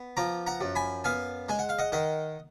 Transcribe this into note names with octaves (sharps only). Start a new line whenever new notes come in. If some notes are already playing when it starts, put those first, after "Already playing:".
Already playing: B3
F3 A#5 D6
F#5 A#5
F#2
G#5 B5
B3 F5 G#5
G#3 G#5
F#5
F5
D#5 F#5
D#3 D#5 F#5